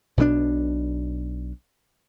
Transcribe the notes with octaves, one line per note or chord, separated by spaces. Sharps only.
B1 B2 D3 D4